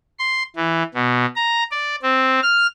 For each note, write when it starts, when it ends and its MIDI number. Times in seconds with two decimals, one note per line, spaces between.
0.19 0.43 84
0.56 0.83 52
0.94 1.26 47
1.36 1.63 82
1.71 1.96 74
2.03 2.40 60
2.43 2.67 89